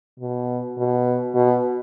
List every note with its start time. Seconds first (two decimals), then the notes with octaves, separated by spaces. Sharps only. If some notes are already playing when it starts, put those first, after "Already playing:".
0.20 B2
0.78 B2
1.35 B2